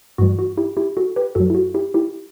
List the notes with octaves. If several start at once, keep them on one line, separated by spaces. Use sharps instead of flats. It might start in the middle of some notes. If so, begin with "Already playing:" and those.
G2 E3 G3 F#4
F#4
E4 G4
E4 G4
F#4 A4
G4 B4
F#2 F#3 F#4 A4
E4
F#4
E4 G4
E4 G4